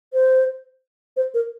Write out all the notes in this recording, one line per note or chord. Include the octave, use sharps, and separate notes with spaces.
C5
C5
A#4